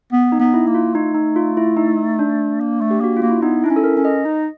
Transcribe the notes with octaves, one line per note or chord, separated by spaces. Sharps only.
B3
D#4
B3
D#4
E4
A#3
F4
A3 D#4
D#4
F4
E4
D#4
D4
A#3
A3
G4
A#3 F#4
F4
A#3
E4
B3 D#4
D4 E4
C#4
A4
A#4
C#4
D#5
D#4